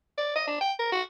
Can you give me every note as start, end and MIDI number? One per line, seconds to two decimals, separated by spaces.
0.18 0.31 74
0.36 0.47 75
0.48 0.57 62
0.61 0.72 79
0.79 0.89 70
0.92 1.02 66